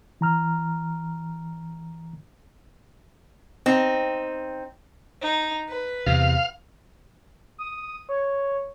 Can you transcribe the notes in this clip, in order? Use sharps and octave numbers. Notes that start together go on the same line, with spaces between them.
E3 A#5 F6
C4 D#4
D#4
B4
E2 C3 F5
D#6
C#5